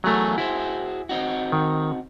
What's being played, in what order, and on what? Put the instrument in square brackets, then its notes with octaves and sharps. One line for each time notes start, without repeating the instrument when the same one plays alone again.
[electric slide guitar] E2 G#4 A#4 [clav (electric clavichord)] F#3 A3
[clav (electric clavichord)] E4 [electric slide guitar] F#4 G#4 C5
[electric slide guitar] C4 D#4 F#4
[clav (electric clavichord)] D#3